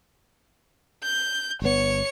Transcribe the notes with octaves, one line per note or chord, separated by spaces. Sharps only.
G6
G1 C#3 B3 C#5 C#7